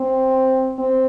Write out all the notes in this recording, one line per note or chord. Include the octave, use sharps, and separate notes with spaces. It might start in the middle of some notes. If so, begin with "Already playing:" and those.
Already playing: C4
C4